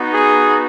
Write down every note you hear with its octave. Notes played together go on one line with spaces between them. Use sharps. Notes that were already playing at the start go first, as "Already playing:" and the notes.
Already playing: B3 D#4 F#4
G#4